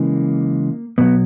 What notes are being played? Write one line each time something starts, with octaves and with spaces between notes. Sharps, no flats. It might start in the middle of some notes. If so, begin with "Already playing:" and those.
Already playing: C#3 E3 G#3 A#3
B2 F#3 B3